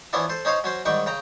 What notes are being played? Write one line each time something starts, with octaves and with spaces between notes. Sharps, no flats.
E3 F3 B3 C#4 D4 E4
A4 C5
C#4 D#4 C5 C#5 F5
F#3 C#4 C5
G#2 D#3 G3 F#5 G5 C#6
C#3 G5 A#5